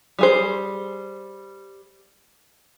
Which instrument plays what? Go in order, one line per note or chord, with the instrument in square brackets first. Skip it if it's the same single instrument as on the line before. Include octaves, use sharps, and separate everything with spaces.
[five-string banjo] G3 G#4 C5